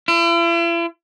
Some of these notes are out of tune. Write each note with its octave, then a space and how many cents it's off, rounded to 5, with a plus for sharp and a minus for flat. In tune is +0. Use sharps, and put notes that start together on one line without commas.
E4 +45